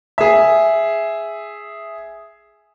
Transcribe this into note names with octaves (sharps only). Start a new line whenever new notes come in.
G#4 E5